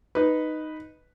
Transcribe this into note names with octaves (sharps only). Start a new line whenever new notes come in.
D#4 B4